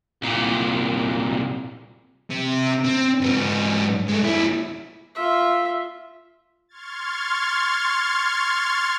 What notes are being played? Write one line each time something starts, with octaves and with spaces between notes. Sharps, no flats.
C2 A#2
C3
C4
G#2 B3
G#3 A3
D#2 E4
F4 E5
C6 C#6 F6 G#6 A6